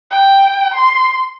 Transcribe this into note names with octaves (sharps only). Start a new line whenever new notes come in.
G5
C6